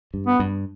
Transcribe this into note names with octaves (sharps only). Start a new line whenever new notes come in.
G2
B3
G2